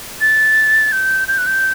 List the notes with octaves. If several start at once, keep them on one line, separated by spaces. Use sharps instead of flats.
A6
G6
G6
F#6
G6